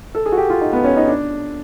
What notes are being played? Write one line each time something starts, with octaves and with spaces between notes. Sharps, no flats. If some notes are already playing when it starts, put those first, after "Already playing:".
A4
G#4
F#4
G4
F4
D#4
B3
C#4
D#4
D4